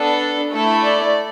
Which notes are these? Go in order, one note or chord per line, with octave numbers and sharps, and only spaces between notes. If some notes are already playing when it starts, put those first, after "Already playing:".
Already playing: B3 D4 A4
A3 E4 A4
D5